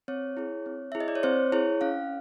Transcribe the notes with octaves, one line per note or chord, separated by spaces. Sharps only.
C4 C#5
E4 G#4
C4
E5
E4 G#4
D#5
D5
C#5
C4 C5
E4 G#4 C#5
C#4 F5